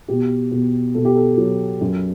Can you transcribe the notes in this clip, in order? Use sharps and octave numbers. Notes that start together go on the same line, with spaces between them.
B2 G4
B2
B2 A4
G4
A4
F#3
F#2